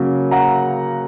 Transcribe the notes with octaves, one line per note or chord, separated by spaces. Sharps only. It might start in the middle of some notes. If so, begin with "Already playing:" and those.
Already playing: C#3 F#3 A#3
F#5 A#5